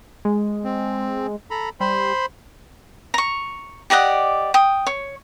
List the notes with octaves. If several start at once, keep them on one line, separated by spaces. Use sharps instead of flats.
G#3
C4
A4 A#5 B5
G3 C5 B5 C6
A#5 C#6
G4 D5 D#5 F#5
G5 D#6
C#5